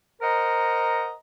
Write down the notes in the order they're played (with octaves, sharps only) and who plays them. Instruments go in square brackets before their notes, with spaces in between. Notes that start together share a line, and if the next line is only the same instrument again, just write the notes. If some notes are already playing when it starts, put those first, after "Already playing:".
[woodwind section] A#4 C5 D#5 F#5 A#5